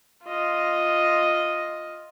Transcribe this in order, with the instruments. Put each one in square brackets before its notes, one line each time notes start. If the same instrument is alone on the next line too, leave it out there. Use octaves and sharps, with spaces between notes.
[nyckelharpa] F4 D#5